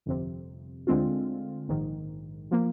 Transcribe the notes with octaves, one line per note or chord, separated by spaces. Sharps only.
G1 F2 C3
D2 D3 G#3 C4 F4
A#1 G#2 D#3
F3 A#3